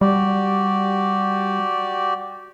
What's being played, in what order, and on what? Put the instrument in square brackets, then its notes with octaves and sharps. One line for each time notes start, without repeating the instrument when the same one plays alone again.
[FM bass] G3 [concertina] F#4 G4 D5